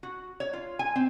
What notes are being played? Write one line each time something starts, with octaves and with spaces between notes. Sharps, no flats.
F#4
C#5
F4
G#5
C4